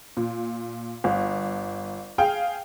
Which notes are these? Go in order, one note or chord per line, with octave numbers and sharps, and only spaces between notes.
A#2
G1
G#4 F5 G5